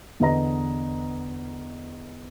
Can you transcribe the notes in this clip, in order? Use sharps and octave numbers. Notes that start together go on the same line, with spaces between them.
E2 D3 B4 D#5 A#5 A#6